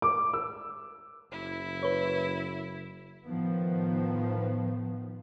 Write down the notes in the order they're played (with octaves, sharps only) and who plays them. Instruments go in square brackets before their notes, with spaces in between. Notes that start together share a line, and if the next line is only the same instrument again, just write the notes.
[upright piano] D6
E6
[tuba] F#1 [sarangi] E4
[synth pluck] B4 C#5
[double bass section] A2 D#3 F3 B3